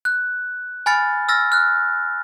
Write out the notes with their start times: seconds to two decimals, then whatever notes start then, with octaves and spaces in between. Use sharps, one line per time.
0.05 F#6
0.86 G#5 B5 F6 A6 C#7
1.29 E6 F6 A6 A#6
1.52 F6 F#6